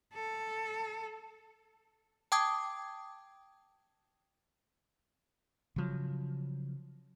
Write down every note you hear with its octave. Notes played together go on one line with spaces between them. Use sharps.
A4
G5 A5 D6 D#6 G#6
C#3 F3 F#3